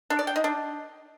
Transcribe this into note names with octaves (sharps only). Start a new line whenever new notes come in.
D4
D5
G5
D#4
D4